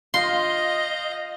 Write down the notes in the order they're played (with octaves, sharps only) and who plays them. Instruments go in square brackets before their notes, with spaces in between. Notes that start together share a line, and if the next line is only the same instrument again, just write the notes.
[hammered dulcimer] F4 [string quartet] D#5 [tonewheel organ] F5 G6 [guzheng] C6